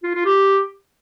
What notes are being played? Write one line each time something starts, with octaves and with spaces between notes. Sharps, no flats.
F4
F4
G4